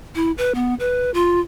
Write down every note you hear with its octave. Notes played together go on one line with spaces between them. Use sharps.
E4
B4
B3
B4
F4